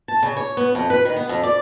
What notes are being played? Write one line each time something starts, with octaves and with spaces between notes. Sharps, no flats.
A5
C#3
C#5
B3
F2
B4
D#3
B3
F2
D5